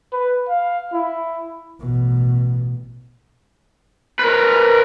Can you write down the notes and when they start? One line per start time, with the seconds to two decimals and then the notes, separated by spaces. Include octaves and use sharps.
0.13 B4
0.49 F5
0.94 E4
1.80 A1 B2
4.19 A#4 B4